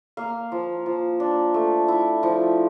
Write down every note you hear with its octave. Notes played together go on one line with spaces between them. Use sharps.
A#3 F5
F3
F3
D4
A3
E4
F3